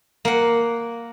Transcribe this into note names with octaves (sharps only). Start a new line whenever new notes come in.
A#3 F#5